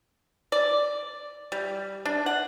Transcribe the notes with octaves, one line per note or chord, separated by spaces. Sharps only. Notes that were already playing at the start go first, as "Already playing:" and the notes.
D5
G3
D4
F#5